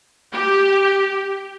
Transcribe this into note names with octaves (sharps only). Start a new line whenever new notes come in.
G4